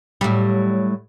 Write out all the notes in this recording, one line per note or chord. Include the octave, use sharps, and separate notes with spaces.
A2 F#3 G3